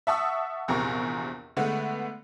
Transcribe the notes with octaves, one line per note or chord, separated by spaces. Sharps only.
E5 F#5 A5 C#6 D#6 E6
A#1 E2 C3 A#4 C#6
D3 G#3 A3 B3